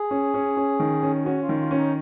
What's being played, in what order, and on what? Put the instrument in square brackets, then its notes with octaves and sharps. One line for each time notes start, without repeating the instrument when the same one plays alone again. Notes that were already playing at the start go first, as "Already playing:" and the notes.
Already playing: [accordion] G#4
[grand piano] C#4
C#4
C#4
D#3
C#4
[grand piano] C#4 [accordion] F#4
[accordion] F4
[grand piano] D#3
[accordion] F4
[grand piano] C#4
[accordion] D#4